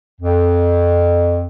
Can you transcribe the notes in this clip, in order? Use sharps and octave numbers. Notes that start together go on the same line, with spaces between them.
F2